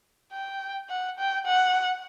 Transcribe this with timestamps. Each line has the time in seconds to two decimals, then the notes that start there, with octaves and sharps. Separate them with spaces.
0.33 G5
0.90 F#5
1.18 G5
1.45 F#5